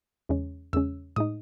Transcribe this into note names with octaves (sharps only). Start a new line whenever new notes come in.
E2 C#3 G#3 C#4
E2 C#3 G#3 C#4 E6
A2 G#3 D#4 D#6